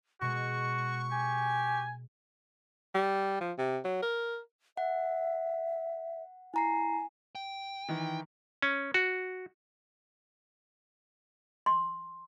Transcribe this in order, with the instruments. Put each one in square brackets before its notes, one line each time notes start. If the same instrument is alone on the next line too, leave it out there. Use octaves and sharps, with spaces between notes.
[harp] B2 G#3 [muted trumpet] F#4 [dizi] C#6
[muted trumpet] G4 [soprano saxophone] G#5
[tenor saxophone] G3
F3
C3
F#3
A#4
[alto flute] E5 [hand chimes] F#5
[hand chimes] E4 A#5 C7 [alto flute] G#5
[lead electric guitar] G5
[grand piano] D#3 E3
[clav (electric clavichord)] C#4
F#4
[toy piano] C6